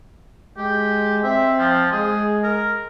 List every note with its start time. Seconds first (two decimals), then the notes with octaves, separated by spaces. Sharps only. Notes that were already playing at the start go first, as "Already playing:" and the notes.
0.57 G#3 G4
1.24 C4 E5
1.59 F3
1.92 G#3 G#4
2.44 A#4